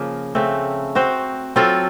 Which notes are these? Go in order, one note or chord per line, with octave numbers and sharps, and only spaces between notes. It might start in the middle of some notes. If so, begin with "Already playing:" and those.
Already playing: C#3 F3 A#3
C#3 A3 C4
C4 F#4 C5
F#3 C4 F4 A4